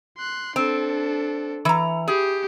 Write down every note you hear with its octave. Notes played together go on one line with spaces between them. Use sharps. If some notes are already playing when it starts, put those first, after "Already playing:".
C6 F#6
C4 D4 A4
E3 A#5
G4 G#4